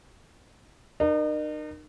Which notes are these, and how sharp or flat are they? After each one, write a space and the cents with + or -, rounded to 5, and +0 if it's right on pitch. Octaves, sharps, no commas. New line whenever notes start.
D#4 -40 A#4 +15